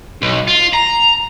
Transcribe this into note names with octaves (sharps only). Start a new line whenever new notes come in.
B1
F4
A#5